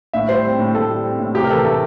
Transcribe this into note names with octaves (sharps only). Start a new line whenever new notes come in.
A2 E5
G3 C5
C4
A2
A2 A4
G3
C4
A2
C3 G4
A#4
E3 A4
A3 A4